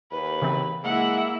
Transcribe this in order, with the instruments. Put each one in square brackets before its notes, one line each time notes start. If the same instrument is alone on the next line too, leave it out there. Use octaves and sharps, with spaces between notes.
[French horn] D#2 [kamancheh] B4
[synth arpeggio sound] C#3 E3 C4
[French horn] G#3 [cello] A#3 E4 [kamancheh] F#5